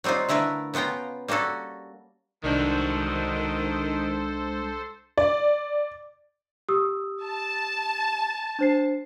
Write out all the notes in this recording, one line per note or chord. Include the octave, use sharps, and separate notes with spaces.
F#3 G3 C4 D#4 F4
D3 A3 E4 A#4 B4
C#3 B3 F4 G5 A#5
G3 A#3 C#4 F#4 A4
C2 D#3 G#3 D4 F#4 A4 C5 G6
D5
G4 D#6 E6
A5
D4 C5 C7